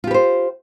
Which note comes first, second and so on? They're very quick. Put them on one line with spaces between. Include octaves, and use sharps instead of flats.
F4 G4 B4 C5